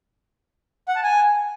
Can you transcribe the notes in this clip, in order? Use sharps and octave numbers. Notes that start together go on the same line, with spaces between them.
F#5
A5
G#5